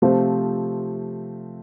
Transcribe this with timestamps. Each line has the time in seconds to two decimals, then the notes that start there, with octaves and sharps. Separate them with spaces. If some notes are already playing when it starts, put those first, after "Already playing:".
0.02 C3 F3 A3 C4 F4